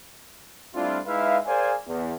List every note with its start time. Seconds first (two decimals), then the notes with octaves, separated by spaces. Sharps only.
0.74 G3 A3 C4 D4 E4 F4
1.07 G#3 D#4 E4 B4 E5 F5
1.47 G#4 A#4 C5 D5 F5 G#5
1.88 E2